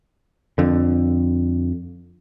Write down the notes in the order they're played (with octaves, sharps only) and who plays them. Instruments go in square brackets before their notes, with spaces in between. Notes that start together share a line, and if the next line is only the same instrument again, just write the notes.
[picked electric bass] F2 D3